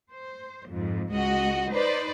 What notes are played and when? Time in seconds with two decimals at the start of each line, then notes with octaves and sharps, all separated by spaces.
0.11 C5
0.68 F2 G#2
1.13 C#2 G#3 F#4 D#5
1.72 D#4 B4 C5 D5